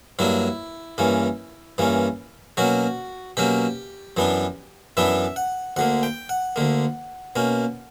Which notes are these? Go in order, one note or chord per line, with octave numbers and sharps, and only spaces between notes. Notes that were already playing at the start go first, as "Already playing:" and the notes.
G2 F#3 A#3 D4 E4
G2 E3 A#3 C#4
G2 E3 A#3 C#4
B2 F#3 A#3 C#4 F#4
B2 F#3 A#3 C#4 G4
F#2 E3 B3 D4
F#2 E3 B3 D4 E5
F#5
D2 D3 A#3 F#5
G5
F#5
D2 D3 A#3
B2 A#3 C#4